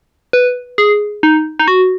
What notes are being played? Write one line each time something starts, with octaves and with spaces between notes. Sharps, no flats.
B4
G#4
D#4
D#4
F#4